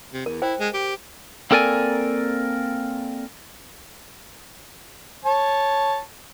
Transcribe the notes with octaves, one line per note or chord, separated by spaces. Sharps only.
C3
E2 A#4
E4 C5 G5
G#3
G4
A#3 C4 A4 A#4 D5 G#5
C#5 A5